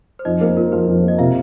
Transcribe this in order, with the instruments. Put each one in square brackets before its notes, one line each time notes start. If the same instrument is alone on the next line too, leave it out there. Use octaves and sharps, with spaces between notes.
[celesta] C5
[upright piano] F2 [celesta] D#4 D#5
[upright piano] A#3 [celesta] C5
[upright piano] F4 [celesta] A#4
[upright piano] F3 [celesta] C5
[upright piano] F2
[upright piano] A#3 [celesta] D#5
[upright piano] C3 [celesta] F4 F5